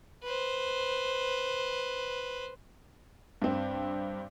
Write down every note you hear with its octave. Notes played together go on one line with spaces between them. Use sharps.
B4 C5
G2 C4